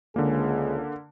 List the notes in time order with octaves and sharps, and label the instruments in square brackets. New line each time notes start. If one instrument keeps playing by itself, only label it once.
[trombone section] C#2 G#3 G#4 [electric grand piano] D3 A#3